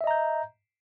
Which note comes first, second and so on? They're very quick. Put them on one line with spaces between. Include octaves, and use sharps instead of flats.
E5 D#5 A#5 G6